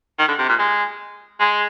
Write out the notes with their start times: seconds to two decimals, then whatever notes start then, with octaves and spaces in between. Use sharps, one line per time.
0.19 D#3
0.28 D3
0.39 C3
0.49 A#2
0.59 G#3
1.40 G#3